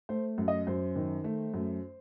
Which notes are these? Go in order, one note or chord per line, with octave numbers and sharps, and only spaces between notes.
A3 C5
F#2
D#5
F#2 C5
D#3
A3
F#2